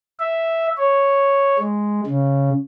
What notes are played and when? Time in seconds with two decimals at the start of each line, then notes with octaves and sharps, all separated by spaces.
0.19 E5
0.77 C#5
1.59 G#3
2.07 C#3